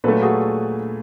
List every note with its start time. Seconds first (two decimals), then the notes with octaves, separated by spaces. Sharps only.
0.04 A#2 F#3 A3 A4 B4
0.22 F#4 G#4